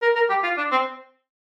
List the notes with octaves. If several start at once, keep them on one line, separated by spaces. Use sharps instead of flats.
A#4
A#4
G4
F4
D4
C4